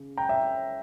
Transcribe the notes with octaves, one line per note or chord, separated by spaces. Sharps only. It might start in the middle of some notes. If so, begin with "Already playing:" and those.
Already playing: C#3
G5 A#5
E5 G5